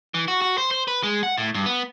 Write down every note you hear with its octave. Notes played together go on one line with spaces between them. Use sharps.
E3
F#4
F#4
C5
C5
B4
G#3
F#5
A2
G2
B3